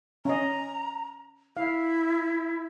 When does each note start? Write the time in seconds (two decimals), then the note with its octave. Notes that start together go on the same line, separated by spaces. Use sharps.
0.25 C#4 D#5 A#5
1.57 E4 F5